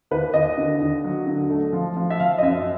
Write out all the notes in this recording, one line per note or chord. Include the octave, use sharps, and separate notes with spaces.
D#2 B4
D#2 D#5
D3
D#2
F#3
D3
A3
F3
F3
E5
F3 F5
D#5
F#2 E5